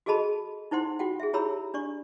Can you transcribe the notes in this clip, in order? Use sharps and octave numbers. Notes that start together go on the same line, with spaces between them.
F#4 G#4 A4 D#5 A5 B5
D#4 E4 C5 F#5 C6
F4 F#4 F#5 G5
G#4 E5
E4 G4 C#5 A#5 B5 E6
D4 D5 C#6